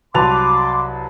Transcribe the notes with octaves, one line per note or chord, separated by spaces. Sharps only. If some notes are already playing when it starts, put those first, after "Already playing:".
C2 F#3 B4 A5 C6 D6 F7